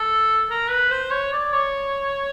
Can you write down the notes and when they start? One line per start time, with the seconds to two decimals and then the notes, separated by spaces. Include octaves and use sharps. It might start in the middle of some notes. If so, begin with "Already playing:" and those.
Already playing: A4
0.50 A#4
0.70 B4
0.91 C5
1.11 C#5
1.33 D5
1.53 C#5